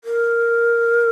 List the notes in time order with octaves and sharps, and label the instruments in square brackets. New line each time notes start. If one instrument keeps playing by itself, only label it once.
[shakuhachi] A#4